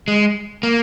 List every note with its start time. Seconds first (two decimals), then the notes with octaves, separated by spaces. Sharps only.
0.08 G#3
0.63 A#3